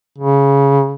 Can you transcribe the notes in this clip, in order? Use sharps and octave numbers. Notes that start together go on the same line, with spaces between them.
C#3